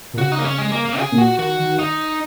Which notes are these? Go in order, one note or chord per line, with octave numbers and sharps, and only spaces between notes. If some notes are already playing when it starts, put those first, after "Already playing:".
A#2
C#3 F#4
D#4
A#3
C#4
G#3
A#3
A#3
C#3 G#4
A#2
F#4
D#3 F#4
D#3
D#4